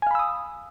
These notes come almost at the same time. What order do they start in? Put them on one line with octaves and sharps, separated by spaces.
G#5 F5 B5 E6 D#6